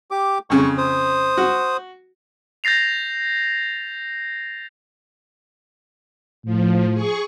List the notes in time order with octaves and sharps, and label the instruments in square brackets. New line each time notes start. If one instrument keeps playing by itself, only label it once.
[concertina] G4 D6
[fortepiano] F2 C#3 [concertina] C#6
[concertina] C5 D#6
[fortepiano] F#4
[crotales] G6 A6 A#6 C7 F7
[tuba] A2 [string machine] F3
[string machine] G#4 C#6